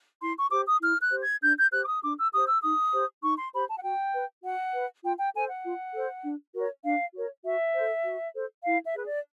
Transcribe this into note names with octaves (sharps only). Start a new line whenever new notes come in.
E4 C6
C#6
G4 C5 D6
D#6
E4 F6
F#6
G4 C5
G#6
D4 G6
G6
G4 C5 F#6
D6
D#6
D4 D6
E6
G4 C5 D#6
E6
D#4 D#6
G4 C5
D#4 C#6
C6
G4 C5 B5
A5
F#5
F#4 G5
B4
F#4 F#5
B4
F4 G5
G5
A4 C5 G#5
F#5
F4
A4 C5
D4
F#4 A#4 C#5
D4 F5
F#4 A#4 C#5
F#4 E5
A4 C5
F#4
A4 C5
E4 F5
E5
G#4 B4
D5